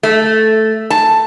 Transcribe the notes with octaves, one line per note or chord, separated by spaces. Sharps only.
A3
A5